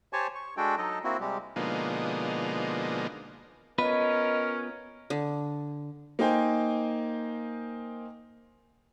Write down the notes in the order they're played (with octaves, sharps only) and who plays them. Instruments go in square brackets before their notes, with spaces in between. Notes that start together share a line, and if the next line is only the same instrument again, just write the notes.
[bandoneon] G4 C5 C#5 G#5 A5 C#6
C#6
G#3 D4 F#4 A4 G5
F#3 D#4 A4 D#5
A#3 C4 E4 F#4
C3 G3 G#3 G4
[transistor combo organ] B2 D3 F3 G#3 A#3 D#4
[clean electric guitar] B3 F4 B4 [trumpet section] C#4 A#4 [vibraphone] D#5
[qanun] D3
[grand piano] A#3 D#4 C5 G5 G#5